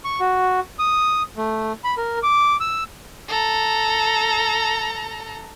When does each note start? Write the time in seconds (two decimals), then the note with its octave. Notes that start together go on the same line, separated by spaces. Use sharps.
0.05 C#6
0.20 F#4
0.79 D#6
1.37 A3
1.84 B5
1.97 A#4
2.23 D6
2.60 E6
3.29 A4 A#5